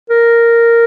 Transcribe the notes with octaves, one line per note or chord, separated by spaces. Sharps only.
A#4